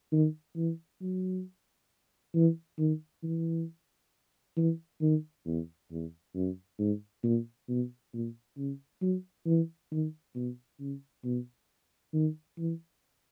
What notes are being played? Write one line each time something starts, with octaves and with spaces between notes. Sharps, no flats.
D#3
E3
F#3
E3
D#3
E3
E3
D#3
E2
E2
F#2
G#2
A#2
B2
A#2
C#3
F#3
E3
D#3
B2
C#3
B2
D#3
E3